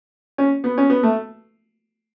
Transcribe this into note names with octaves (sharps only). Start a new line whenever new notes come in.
C#4
B3
C#4
B3
A3